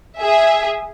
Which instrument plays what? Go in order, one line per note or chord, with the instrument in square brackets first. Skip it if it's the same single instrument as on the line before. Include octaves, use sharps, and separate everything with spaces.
[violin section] G#4 E5